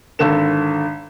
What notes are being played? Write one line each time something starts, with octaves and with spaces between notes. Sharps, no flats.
G#1 D3 A4 E7